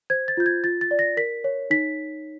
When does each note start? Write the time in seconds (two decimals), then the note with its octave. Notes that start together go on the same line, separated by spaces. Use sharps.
0.10 C5 G#6
0.28 A6
0.37 F4 G6
0.46 G#6
0.64 F4 A6
0.81 A6
0.91 D5
0.99 A#6
1.17 A#4 B6
1.44 C#5
1.70 D#4 B6